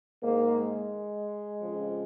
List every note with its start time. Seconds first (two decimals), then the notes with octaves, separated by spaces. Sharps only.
0.22 G#2 D#3 A#3
0.57 G#3
1.61 F2 C#3 F3